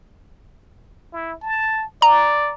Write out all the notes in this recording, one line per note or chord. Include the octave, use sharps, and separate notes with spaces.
E4
A5
D5 A#5